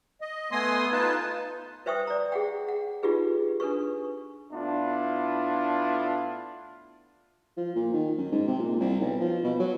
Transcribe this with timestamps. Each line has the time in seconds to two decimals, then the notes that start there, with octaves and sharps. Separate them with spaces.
0.21 D#5
0.51 A3 B3 G#5 C6 D#6
0.92 D#4 F4 B4 A5
1.86 B4 C5 E5 G5 C#6 D#6
2.07 D5 A#5
2.32 G#4 F#5 G5
2.68 F#5
3.03 D#4 F4 G4 G#4 B4
3.60 D4 A4 B4 C#6
4.53 A2 B3 D4 E4 F4
7.57 F3
7.75 A#2
7.93 D#3
8.18 F#2
8.31 G#2
8.47 C3
8.59 A#2
8.80 C2
9.00 B1
9.20 F3
9.44 B2
9.60 F#3